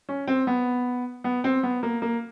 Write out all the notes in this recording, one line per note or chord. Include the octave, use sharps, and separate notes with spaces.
C#4
C4
B3
B3
C4
B3
A#3
A#3